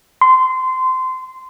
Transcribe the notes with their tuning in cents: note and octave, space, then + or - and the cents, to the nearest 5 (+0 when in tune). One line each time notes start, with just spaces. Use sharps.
C6 -20